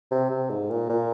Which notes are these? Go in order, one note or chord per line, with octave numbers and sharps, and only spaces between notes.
C3
C3
G#2
A#2
A#2